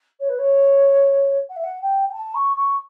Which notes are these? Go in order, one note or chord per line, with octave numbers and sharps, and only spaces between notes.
C#5
B4
C#5
F#5
E5
F#5
G5
G5
A5
C#6
C#6